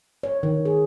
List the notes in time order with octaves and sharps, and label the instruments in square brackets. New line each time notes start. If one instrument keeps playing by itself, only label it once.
[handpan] C#5
D#3
G#4